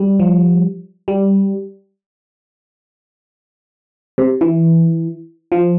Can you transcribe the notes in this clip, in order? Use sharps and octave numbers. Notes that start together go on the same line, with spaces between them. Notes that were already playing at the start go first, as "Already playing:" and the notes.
Already playing: G3
F3
G3
C3
E3
F3